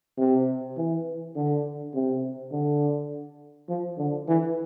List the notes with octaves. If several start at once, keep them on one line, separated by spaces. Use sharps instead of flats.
C3
E3
D3
C3
D3
F3
D3
E3